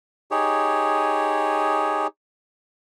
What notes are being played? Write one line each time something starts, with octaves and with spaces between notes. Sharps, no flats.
D#4 G4 G#4 C#5